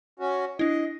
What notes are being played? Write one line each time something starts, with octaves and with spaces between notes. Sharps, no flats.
C#4 F#4
D4 E4 D#5